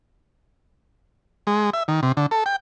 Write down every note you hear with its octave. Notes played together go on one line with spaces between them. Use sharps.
G#3
E5
D#3
C3
D3
A4
G5